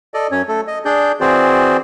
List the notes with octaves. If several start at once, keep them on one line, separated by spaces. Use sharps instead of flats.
A4 D5 D#5
F#2 C#4 C#5
A3 A4
D#5
D4 G#4 D5 G6
E3 C4 F#4 G#4 C5 D5